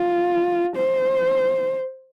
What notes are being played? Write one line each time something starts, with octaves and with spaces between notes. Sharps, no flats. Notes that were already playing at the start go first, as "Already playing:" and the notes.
Already playing: F4
C5